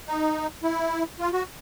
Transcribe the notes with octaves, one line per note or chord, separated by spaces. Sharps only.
D#4
E4
F4
F#4